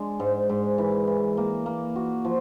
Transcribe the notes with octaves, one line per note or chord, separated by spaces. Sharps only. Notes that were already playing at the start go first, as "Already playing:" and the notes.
Already playing: G#3 D4
G#2
G#2
E3
E3
A#3
A#3
F#4
F3